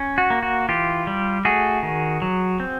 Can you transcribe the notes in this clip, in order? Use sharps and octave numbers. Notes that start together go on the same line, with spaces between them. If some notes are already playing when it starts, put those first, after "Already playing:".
Already playing: C#4
F#4
A#3
F#4
E3 F4 G4
G3
A3 F#4 G#4
D#3
F#3
C4